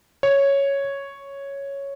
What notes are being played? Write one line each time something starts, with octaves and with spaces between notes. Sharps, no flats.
C#5